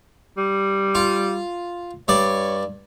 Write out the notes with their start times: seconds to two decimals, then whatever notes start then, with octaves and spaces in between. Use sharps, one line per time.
0.37 G3
0.95 F4
2.08 G2 C#5 D5